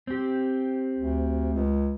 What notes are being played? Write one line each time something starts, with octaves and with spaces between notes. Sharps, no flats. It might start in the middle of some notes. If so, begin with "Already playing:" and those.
C4 G4
D2
C#2